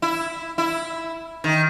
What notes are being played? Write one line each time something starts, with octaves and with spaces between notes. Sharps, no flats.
E4
E4
D#3